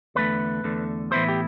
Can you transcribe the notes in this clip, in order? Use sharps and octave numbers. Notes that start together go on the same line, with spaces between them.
E2 D3 A3 B4
E2 D3 A3
A2 E3 B3 E4 C5
G4